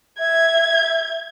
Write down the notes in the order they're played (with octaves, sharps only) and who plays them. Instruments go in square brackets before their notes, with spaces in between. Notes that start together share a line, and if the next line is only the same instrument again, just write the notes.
[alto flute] E5 [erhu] G#6